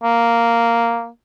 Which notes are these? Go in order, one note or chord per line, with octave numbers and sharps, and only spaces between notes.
A#3